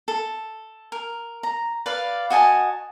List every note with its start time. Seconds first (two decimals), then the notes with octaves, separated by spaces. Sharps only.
0.08 A4
0.92 A#4
1.43 A#5
1.86 B4 D5 F5
2.30 F#4 D#5 G#5 A5